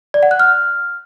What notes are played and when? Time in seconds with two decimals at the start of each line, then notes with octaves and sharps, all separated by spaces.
0.14 D5
0.23 F#5
0.31 F#6
0.40 F6